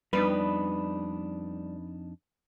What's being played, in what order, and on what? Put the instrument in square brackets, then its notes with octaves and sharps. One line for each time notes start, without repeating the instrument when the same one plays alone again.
[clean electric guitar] F2 D4 D#4 [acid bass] G3 [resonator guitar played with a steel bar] B3 B4